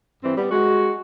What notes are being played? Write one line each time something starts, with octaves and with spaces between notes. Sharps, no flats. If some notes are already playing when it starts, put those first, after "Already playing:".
G2 E3 C4
G3 B3
G#3 F#4